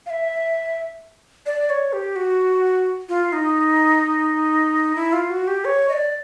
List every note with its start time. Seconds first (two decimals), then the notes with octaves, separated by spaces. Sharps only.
0.06 F5
0.10 E5
1.46 D5
1.70 C#5
1.93 G4
2.16 F#4
3.09 F4
3.33 D#4
4.95 E4
5.13 F4
5.30 F#4
5.48 G4
5.65 C#5
5.89 D#5
5.93 D5